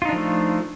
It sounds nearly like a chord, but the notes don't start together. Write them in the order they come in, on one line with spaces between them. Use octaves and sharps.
F4 D#4 D4 F3 A3